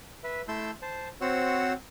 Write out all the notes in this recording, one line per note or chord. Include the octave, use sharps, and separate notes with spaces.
B4 E5
A3 E4 A5 C6 E6 G6
C5 A5
C4 F#4 C5 C#5 F#5 E6